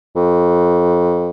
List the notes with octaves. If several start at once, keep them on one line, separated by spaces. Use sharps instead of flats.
F2